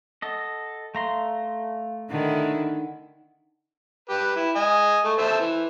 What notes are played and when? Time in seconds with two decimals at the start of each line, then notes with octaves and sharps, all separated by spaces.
0.22 A4 D#5 F#5
0.95 A3 F5 A#5 C6
2.10 D3 D#3 D#4 E4 F#5
4.10 G4 B4
4.36 E4
4.55 D#5 G#5
5.05 A3
5.18 A4 C5 E5
5.40 E3